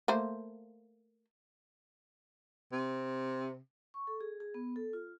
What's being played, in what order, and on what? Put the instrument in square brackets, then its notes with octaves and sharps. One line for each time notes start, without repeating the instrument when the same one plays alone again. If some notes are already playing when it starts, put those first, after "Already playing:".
[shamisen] A3 A#3 C5
[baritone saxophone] C3
[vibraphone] C#6
A4
G#4
G#4
B3
A4
F4